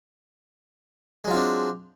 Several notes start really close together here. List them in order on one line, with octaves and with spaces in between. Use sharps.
G#3 F#3 F4 C4 D4